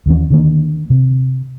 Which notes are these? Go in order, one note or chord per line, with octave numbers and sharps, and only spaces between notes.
D#2 E3 C#4
D3 D#3 A#3
C3